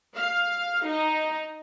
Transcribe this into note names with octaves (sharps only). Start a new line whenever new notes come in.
F5
D#4